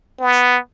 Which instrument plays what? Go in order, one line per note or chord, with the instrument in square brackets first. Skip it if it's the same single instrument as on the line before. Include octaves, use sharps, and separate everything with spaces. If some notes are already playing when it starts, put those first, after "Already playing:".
[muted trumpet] B3